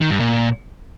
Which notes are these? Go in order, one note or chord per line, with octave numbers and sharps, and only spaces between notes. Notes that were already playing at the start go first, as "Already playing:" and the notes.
D#3
G2
A#2